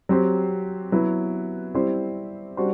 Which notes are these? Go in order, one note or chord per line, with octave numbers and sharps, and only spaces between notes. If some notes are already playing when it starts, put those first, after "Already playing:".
F#3 C4 G4 C5
F#3 B3 E4 B4
G3 C4 E4 G4 C5
G3 D4 F#4 C5